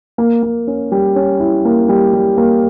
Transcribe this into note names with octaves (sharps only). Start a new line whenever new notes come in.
A#3
A#3
C#4
G3
C#4
E4
A#3
G3
G3
A#3